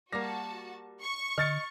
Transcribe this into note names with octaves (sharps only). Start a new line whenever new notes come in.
G3 A#3 F#4 A5 A#6
C#6
D3 D#5 F6 A6 C#7